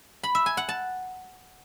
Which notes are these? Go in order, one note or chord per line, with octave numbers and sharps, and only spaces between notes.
B5
E5
G#5
F#5
A5